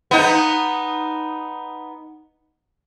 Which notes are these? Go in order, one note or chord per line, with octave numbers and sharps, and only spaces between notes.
B3 D#4